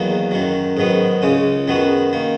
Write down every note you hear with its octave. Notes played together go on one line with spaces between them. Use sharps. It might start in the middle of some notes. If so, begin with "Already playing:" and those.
Already playing: E2 D#3 F#3 A#3
F#2 D#3 F#3
G#2 D#3 F#3 B3
C#2 C#3 G#3 C#4
F#2 D#3 F#3 B3 F#4
D#3 A#3